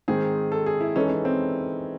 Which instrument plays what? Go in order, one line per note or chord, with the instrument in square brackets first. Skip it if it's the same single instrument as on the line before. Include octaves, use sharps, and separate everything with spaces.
[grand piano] G#2 D#3 G#3 C4 [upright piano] G#4
[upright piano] A4
G#4
E4
[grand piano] E3 G#3 D#4 A4 [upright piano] C#4
[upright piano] C#4
C4